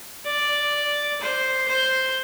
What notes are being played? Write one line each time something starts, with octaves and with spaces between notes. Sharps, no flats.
D5
C5
C5